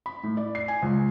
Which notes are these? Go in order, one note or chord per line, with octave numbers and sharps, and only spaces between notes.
B5
A2
D5
C7
G#5
C#2